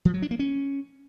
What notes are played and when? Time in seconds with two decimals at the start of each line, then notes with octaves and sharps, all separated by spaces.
0.05 F3
0.14 F#3
0.22 D4
0.31 A#3
0.39 C#4